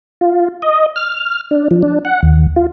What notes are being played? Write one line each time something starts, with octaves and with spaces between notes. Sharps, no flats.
F4
D#5
F6
D4
F3
D4
F#5
D#2
F4